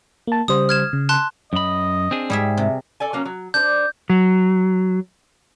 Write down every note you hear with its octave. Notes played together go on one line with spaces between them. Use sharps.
A#3 A5
C#3 G3 C5 D#6
F6 G#6 E7
C#3
A5 C6 F#6
F#2 D#5 B5
C4 D4 G#4
G#2 G3 G#4 E5
C3
A4 D5 G#5
F#3 A#3 C#4
F#3
D4 C5 G6
F#3